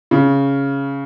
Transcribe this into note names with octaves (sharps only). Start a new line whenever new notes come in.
C#3